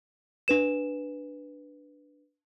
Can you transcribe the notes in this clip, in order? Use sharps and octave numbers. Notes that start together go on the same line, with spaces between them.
D4 B4 E7